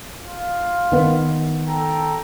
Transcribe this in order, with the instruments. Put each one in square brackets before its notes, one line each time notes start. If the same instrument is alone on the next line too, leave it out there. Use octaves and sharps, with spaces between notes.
[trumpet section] F4
[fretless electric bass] D#3 B3
[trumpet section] A4 G5 A#5